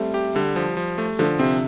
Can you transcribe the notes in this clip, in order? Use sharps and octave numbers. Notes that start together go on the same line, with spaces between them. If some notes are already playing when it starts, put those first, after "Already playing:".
Already playing: G3 A3 C4
G4
D3 G3
F3
F3
A3
D3 F3
C3 C4